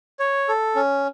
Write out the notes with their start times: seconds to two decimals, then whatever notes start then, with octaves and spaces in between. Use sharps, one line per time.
0.19 C#5
0.49 A4
0.75 C#4